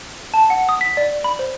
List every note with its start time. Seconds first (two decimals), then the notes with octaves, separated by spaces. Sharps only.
0.34 A5
0.50 F#5
0.69 D#6
0.81 B6
0.97 D5
1.24 B5
1.39 C5